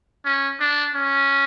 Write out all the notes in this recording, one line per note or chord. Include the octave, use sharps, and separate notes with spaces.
C#4
D4
C#4